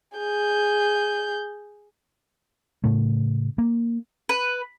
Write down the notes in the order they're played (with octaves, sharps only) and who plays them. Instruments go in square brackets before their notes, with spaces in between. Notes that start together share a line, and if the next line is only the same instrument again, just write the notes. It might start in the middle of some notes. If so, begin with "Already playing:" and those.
[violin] G#4 G6
[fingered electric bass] A2 C#3 A3
A#3
[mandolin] B4